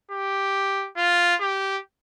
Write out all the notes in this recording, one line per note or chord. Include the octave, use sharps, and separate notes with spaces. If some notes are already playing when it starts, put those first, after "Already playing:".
G4
F4
G4